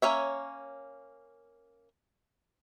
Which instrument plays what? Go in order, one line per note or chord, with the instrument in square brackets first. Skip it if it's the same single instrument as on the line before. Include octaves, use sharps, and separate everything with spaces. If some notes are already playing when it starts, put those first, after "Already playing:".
[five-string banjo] A#3 C#4 C#5 E5